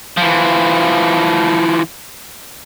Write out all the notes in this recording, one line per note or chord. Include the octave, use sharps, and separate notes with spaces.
E3 F3